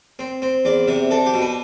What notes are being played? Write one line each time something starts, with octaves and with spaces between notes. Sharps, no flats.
C4
C4
E2 D5
C3 E5
D4 A4
G4
B2
B4